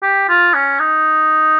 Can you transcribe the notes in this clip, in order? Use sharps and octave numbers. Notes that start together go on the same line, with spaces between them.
G4
F4
C#4
D#4